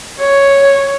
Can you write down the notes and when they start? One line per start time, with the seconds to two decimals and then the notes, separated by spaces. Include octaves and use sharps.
0.20 C#5